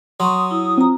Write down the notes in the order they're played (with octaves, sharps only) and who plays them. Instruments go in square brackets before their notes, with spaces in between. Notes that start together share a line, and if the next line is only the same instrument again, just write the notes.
[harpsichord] F#3 [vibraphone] C6 C#6 [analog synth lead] D#6
[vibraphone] E4
[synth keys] C4 [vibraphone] F4 A#5